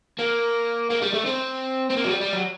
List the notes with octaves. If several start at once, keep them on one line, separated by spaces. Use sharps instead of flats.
A#3
A#3
G3
A3
C4
C4
A#3
F#3
G3
G3
F#3